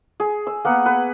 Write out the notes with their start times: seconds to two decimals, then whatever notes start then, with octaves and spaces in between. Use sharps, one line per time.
0.20 G#4
0.47 E6
0.65 A#3 B3 F#5
0.86 B4